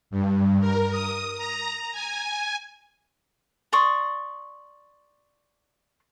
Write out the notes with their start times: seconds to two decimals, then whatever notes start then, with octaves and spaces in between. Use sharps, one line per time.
0.11 G2
0.60 A#4
0.90 D#6
1.37 A#5
1.92 G#5
3.73 D5 C6 C#6 D#6